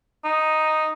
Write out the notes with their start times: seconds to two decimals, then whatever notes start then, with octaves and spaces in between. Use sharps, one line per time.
0.24 D#4